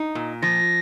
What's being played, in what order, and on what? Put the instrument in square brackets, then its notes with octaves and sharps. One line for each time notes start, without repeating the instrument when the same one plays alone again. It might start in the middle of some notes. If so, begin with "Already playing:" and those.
Already playing: [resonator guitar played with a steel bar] D#4
A#2
[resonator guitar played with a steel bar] F3 [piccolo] A#6